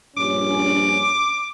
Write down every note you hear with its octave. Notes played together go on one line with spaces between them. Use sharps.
A#1 G2 C#4 D6